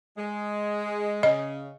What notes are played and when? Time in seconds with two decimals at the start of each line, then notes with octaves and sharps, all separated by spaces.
0.18 G#3
1.23 C#3 D#5